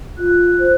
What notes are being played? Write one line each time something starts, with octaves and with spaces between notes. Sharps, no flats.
F4 F#6
C5